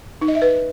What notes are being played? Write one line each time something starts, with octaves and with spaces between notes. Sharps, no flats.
D#4
D#5
E5
B4